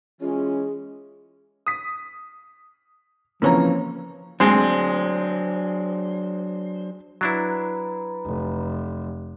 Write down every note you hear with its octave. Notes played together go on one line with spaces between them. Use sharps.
E3 G#3 C#4 F4 G#4
D#6 B6
C#3 E3 F3 A#3 C4 C#5 A#5
D2 F#3 G#3 C4 D4 C5
F#3 D4 E4 B4 A#5 B5
F1